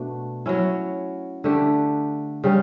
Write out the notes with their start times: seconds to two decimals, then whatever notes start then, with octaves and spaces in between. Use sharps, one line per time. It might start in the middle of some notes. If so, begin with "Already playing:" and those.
Already playing: B2 A3 D4 F#4
0.46 F#3 C#4 E4
1.44 D3 A3 D4 G4
2.44 C#3 G3 C#4